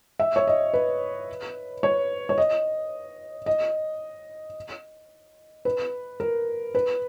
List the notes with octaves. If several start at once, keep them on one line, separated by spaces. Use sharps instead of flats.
E5
C#5
D#5
B4
C#5
C#5
D#5
D#5
B4
A#4
B4